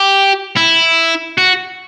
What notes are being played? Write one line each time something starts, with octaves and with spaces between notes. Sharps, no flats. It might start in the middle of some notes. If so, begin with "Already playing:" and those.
Already playing: G4
E4
F#4